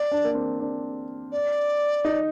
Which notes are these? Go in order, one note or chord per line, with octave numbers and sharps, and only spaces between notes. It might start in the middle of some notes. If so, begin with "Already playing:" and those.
Already playing: D5
D4
A#3
C4
D4
D5
D#4